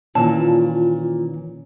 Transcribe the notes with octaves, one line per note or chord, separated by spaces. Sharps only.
A#2 D#3 E3 C#4 F4 A5